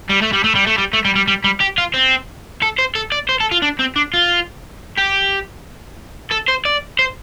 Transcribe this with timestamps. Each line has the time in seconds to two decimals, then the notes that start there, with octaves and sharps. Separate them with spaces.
0.09 G3
0.22 A3
0.33 G3
0.44 A3
0.55 G3
0.67 A3
0.78 G3
0.93 A3
1.05 G3
1.16 G3
1.28 G3
1.44 G3
1.61 G4
1.78 F4
1.94 C4
2.62 A4
2.78 C5
2.95 A4
3.12 D5
3.29 C5
3.40 A4
3.52 F4
3.62 D4
3.79 C4
3.96 D4
4.14 F4
4.97 G4
6.31 A4
6.48 C5
6.65 D5
6.99 C5